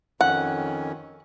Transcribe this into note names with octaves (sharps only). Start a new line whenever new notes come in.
F2 D#3 C#4 F#5